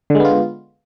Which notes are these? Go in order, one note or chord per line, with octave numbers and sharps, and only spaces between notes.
D3 G#3 B3 F4